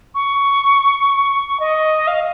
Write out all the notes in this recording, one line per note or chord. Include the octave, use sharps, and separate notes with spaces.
C#6
D#5
F5